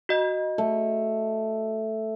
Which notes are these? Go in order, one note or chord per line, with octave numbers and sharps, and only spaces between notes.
F#4 D#5
A3